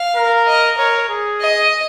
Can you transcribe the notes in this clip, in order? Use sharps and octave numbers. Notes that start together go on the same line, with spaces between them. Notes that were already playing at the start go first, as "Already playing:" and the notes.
Already playing: F5
A#4
D#5
A#4 C#5
G#4
D#5